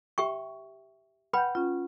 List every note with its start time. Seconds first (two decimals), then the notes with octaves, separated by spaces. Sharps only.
0.18 G4 E5 G5 C#6
1.33 B4 F#5 G5 B5 G6
1.55 C#4 F4